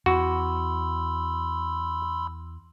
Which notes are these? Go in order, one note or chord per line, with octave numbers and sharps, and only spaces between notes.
E2 F#4 B5 C6 E6